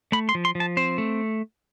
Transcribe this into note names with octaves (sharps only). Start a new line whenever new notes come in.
A3 B5
C6
F3
C6
F3
A5
C4 C5
A3